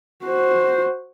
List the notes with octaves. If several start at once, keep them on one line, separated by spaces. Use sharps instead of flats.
F#4 C5